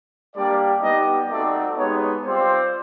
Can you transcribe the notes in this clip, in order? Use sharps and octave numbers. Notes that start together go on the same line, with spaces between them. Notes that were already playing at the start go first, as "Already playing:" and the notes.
G3 A#3 D4 G4 D5
G3 B3 D#4 G4 D#5
A3 C4 D#4 F#4 D5
G#3 B3 D#4 G4 C#5
G3 C4 F4 C5